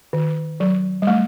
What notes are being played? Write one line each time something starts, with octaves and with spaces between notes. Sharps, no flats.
D#3
F#3
G3
A3